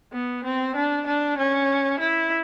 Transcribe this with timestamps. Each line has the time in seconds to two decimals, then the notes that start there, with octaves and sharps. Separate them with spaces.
0.13 B3
0.45 C4
0.76 D4
1.07 D4
1.38 C#4
2.00 E4